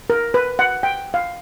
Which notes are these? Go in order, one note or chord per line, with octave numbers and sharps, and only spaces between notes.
A#4
B4
F#5
G5
F5